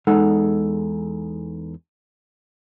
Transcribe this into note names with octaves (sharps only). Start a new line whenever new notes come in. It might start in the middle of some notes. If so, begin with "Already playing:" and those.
E2 G#3 D#4 A4 F#5